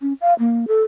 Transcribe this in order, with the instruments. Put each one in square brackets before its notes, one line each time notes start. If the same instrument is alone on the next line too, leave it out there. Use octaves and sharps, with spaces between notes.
[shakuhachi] C#4
F5
A#3
A4